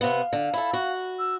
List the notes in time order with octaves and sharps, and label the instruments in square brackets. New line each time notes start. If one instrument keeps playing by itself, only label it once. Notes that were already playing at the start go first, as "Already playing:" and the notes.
[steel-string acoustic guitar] C3 B3 [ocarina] F5
[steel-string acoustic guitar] D3
E4 A4
F#4
[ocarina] E6